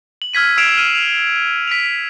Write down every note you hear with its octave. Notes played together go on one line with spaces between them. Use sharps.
F#7
E6 F6 G#6 B6 D#7
E6 G#6 C7 D7 E7 F7
F6 D#7
F7
B6 D7 F7